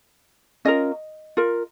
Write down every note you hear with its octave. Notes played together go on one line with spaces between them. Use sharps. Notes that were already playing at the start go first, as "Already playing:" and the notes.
C#4 F4 A#4 D#5
F4 A#4